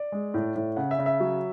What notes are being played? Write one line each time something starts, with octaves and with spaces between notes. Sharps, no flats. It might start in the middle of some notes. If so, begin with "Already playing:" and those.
Already playing: D5
G#3
A2
A2
C#3 F#5
E5
C#3
E5
F#3